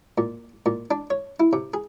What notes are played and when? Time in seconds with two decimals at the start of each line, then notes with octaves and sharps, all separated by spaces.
0.18 A#2
0.66 A#2
0.91 D4
1.10 C#5
1.40 E4
1.53 C3
1.74 G#4